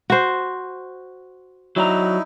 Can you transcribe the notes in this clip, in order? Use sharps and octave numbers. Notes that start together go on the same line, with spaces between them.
F#4 C5
F#3 D#4 E4 D5 A#5